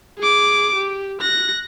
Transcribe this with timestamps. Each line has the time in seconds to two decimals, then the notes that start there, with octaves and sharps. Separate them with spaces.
0.19 G#4 D6
0.75 G4
1.21 F#6 A#6